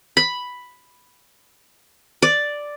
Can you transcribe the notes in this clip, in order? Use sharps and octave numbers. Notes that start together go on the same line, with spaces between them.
B5
D5